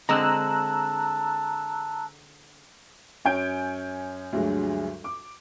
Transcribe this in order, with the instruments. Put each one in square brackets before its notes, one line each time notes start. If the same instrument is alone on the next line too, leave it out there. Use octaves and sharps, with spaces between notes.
[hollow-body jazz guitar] D3 G#3 C4 [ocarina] A5 [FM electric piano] A#5 E6 F#6
[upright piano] F#2 C#5 G#5 G6 D7
D2 G2 D3 F#3 G#3
D6